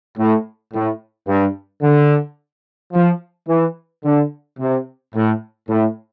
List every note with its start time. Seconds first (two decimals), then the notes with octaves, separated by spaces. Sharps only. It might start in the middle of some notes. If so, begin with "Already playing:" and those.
0.18 A2
0.74 A2
1.28 G2
1.83 D3
2.94 F3
3.49 E3
4.05 D3
4.60 C3
5.15 A2
5.69 A2